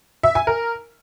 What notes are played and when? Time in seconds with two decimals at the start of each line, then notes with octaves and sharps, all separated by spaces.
0.23 E5
0.35 G#5
0.47 A#4